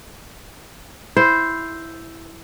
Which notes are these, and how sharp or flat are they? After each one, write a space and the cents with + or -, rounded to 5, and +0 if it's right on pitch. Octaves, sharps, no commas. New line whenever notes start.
E4 +0 C5 +0